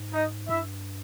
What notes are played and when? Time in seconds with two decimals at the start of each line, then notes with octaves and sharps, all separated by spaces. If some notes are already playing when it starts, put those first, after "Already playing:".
Already playing: G#2
0.14 D#4 D#5
0.49 G2 E4 E5